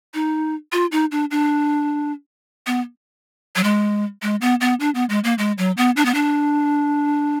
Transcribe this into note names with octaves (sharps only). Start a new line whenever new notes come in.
D#4
F4
D#4
D4
D4
B3
F#3
G#3
G#3
B3
B3
D4
B3
G#3
A#3
G#3
F#3
B3
D4
B3
D4